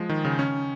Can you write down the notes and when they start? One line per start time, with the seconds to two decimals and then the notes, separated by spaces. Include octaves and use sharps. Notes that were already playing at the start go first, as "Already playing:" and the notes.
Already playing: F3 G#3
0.09 D#3
0.25 C#3
0.39 C#4